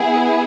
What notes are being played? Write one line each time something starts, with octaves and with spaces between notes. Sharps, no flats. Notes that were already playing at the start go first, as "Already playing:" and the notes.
Already playing: B3 E4 G#4